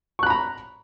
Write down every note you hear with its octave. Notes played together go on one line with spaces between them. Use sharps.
A#5 B5 C#6 F#6